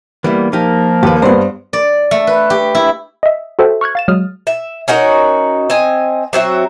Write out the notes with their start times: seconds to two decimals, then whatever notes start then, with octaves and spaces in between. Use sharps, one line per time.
0.24 E3 G3 A#3 B3 E4
0.53 F3 A#3 D#4 G4 A#4
1.03 D#2 G4 B4
1.22 G2 B3 C5 F#5
1.73 D5
2.11 A3
2.27 B4
2.50 G4
2.75 E4
3.23 D#5 E5
3.59 F#4 A4 C5 E5 G5
3.81 C#6 F6 F#6 G#6
3.95 F5 A6 E7
4.08 F#3 G#3 D#6 F6
4.47 E5
4.88 C#4 D#4 F#4 A#4
5.70 C4 D#5 G#5
6.33 F#3 C4 F#4 E5